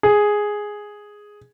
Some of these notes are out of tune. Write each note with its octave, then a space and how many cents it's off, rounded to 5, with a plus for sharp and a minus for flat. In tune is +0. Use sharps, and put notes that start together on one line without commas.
G#4 +0